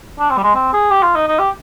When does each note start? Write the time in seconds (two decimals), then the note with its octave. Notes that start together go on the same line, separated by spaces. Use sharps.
0.19 D4
0.30 C4
0.37 G3
0.43 G#3
0.55 C4
0.73 G#4
0.91 G4
1.03 F4
1.15 D#4
1.27 D#4
1.39 G4